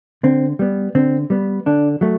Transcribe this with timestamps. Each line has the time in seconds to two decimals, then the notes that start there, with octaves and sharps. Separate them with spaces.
0.23 D3 C4
0.59 G3 B3
0.95 D3 C4
1.30 G3 B3
1.66 D3 D4
2.01 F#3 A3